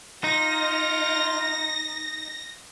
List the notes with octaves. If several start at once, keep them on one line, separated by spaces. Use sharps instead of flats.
D#4 F4 A#6